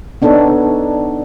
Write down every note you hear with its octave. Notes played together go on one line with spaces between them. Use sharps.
B3 D4 D#4 A4 C#5